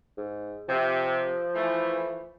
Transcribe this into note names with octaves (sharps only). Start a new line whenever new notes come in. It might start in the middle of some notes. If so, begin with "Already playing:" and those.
G#2
C3 F3
E3 A3